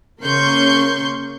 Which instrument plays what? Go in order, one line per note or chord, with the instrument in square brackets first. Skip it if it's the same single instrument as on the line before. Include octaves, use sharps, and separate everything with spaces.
[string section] C#3 A#3 C#4 C6 C#6 G6